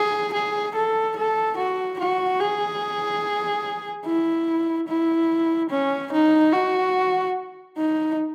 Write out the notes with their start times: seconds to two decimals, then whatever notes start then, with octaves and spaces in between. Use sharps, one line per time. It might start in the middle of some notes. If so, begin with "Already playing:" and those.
Already playing: G#4
0.34 G#4
0.76 A4
1.17 A4
1.58 F#4
2.00 F#4
2.40 G#4
4.06 E4
4.89 E4
5.70 C#4
6.13 D#4
6.53 F#4
7.78 D#4